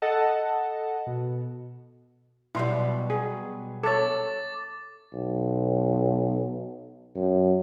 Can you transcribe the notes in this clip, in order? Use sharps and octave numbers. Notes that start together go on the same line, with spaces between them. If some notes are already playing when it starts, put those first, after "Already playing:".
A4 D#5 F#5 A5
B2
B2 F#3 G3 E4 C6
G#4
A4 C#5 D6 A6
B1
F#2